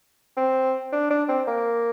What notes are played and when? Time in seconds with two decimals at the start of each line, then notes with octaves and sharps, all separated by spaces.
0.37 C4
0.92 D4
1.11 D4
1.29 C4
1.47 A#3